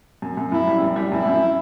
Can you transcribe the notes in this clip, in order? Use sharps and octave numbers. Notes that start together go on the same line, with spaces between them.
F#2
F#2
F#2 E4
G3
F#2
G3
F#2 E4
F#2